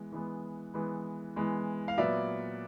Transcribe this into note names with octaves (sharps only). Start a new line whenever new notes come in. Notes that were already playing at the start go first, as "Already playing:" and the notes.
Already playing: E3 G#3 B3
E3 G#3 B3
E3 G#3 B3
E3 G#3 B3
F5
A#2 F#3 B3 D5 E5